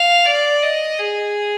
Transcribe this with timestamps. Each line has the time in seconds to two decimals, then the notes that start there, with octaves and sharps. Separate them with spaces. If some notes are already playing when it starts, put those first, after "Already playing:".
Already playing: F5
0.25 D5
0.62 D#5
0.98 G#4